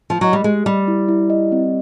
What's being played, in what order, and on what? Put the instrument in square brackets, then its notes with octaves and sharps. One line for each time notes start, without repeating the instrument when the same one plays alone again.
[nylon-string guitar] F3
[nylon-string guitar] F#3 [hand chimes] D#5
[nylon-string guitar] G3
[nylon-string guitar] G#3 [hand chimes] G4
[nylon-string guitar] G3 [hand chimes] G4
[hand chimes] E4
E4
D#5
C4